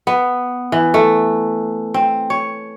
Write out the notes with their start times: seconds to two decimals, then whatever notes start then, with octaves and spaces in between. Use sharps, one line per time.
0.07 B3
0.72 E3
0.94 A3
1.94 C4
2.30 C#5